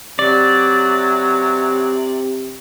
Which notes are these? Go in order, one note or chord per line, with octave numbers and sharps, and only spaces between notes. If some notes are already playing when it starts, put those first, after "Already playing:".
C3 F#3 D5